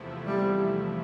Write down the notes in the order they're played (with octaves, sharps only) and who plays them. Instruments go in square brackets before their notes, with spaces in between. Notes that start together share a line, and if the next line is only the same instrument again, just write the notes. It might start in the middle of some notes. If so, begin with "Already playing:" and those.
Already playing: [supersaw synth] E2 C3 F3 A3 E4
[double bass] G3